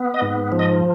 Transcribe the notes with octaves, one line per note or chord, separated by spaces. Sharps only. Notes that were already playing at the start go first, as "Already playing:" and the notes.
Already playing: B3
D#5
G#2
F3
D#5